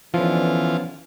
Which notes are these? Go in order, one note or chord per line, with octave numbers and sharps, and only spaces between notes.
D3 E3 F3 B3 C#4 F4